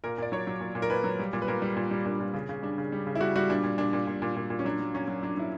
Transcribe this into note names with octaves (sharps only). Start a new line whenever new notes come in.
A#2 A#4
A#2 D5
F#3 C#5
F#3
A#2
A#2
A#4
A#2 B4
F#3
G3
A#2
B4
A#2 A#4
G3
A#2
G3
A#2 D4
A#2
C#3
C#3
G3 D4
C#3
G3
C#3
E4
G3 F#4
G3 F#4
A#2 D4
A#2
A#2 D4
A#2
A#2
A#2
A#2
A#2
C#4
F#3 D4
F#3
F#3 C#4
F#3
F#3 D4
F#3 E4